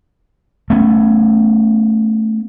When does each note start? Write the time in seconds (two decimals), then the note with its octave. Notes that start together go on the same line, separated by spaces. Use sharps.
0.70 A3 B3 C#4